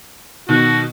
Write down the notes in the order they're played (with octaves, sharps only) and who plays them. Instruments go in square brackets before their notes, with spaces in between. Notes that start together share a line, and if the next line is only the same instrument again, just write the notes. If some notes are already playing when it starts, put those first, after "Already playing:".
[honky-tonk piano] B2 D#3 [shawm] F#4